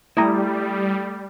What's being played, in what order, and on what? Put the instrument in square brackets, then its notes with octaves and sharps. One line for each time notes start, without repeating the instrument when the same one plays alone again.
[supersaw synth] G3 [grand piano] A3 D#6 [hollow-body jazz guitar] E4 A#5